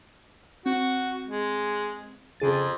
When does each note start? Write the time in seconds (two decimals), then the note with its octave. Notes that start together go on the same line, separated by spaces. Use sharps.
0.66 C4 F#4
1.26 G#3
2.40 F2 C#3 G#4 A6